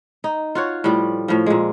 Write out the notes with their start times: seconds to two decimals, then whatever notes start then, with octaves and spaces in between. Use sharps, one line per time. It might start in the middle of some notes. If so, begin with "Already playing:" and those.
0.24 D#4
0.55 F4 F#4 C#5
0.84 A2 F3 G3
1.28 A2 F3
1.46 A#2 G#3